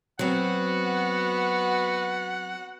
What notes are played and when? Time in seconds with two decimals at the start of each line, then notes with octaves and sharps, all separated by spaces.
0.19 F#3 B3 C4 F#4 F#5